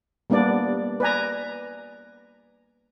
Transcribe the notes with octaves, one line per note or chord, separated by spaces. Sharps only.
G3 A#3 B3 D4 D5
B4 D5 G#5 A#5